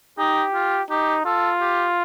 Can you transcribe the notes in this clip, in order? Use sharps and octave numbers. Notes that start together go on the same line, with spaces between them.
D#4 G4
F4
D#4 G4
F4 A4
G4